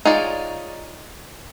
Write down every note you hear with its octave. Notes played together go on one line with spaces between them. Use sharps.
D#4 F4 G#4 C#5 D5